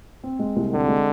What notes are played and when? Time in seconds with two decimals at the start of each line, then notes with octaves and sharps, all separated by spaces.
0.24 C4
0.39 G#3
0.56 C2
0.73 D3 C4
0.88 G#3